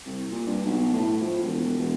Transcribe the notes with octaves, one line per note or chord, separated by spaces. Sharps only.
C2
A#2
G2
B1
A2
F3
E1
E1